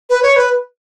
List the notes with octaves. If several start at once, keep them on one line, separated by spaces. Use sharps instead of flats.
B4
C#5
B4